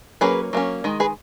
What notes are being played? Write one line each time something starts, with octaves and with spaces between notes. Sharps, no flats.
F#3 A#3 C#4 G#4 B4
F#3 A#3 C#4
D#3 G#3
G#4 B4